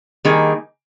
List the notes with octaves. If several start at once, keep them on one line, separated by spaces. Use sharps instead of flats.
D#3 G3 A#3 D#4 G#4